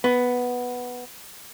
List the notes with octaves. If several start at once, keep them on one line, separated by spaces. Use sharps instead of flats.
B3